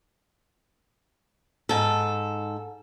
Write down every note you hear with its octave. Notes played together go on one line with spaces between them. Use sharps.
G#2 A4